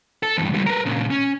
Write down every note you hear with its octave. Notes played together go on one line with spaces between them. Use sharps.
A4
E2 G2
C#2 G3
A#4 B4
A#2 C#3
C#4